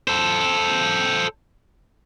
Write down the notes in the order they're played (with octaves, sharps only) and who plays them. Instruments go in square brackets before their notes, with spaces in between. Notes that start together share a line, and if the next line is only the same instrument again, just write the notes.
[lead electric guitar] A4 C5